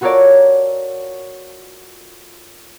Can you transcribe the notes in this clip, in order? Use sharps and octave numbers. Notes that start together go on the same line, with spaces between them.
F4 F#4 A4 A#4 C#5 D5